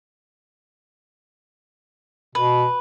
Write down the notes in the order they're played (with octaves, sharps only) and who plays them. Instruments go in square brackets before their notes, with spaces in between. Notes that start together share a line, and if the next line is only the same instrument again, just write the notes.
[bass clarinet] B2 [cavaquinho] B4